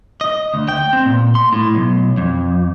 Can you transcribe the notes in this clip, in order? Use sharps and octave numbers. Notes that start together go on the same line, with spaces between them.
D#5
D2
G5
C4
A#2
C6
A2
B1
F2